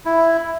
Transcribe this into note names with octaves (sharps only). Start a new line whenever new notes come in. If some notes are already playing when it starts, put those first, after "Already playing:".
E4